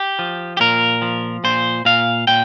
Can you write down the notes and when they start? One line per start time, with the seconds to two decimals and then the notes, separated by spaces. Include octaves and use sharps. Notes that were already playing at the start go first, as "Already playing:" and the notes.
Already playing: G4
0.19 F3
0.57 G4
0.60 A#2 A#4
1.02 F3
1.44 A#2 C5
1.85 A#2 F5
2.27 A#2 G5